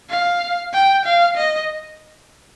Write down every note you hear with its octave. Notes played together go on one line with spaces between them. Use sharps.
F5
G5
F5
D#5